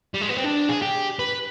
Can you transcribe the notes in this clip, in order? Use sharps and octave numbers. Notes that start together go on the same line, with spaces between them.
G3
G#3
B3
C4
D4
G#4
G4
B4